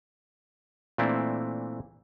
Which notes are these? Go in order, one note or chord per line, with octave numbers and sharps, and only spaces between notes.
A#2 E3 A3 C4 D4 E4